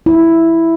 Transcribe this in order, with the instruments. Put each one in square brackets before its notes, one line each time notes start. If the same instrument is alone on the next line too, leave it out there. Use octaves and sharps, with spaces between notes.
[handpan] E4